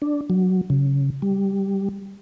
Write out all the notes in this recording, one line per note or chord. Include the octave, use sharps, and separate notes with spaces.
D4
F#3
C#3
G3